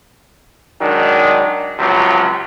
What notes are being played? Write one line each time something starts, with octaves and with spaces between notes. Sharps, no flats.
D#3 F#3 G#3 D4
C#2 C3 F3 F#3